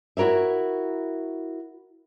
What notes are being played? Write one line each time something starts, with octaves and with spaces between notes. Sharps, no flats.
E4 F#4 A#4 C#5 E5